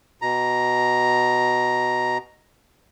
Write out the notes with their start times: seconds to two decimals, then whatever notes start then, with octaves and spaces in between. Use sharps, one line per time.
0.22 B2 A#5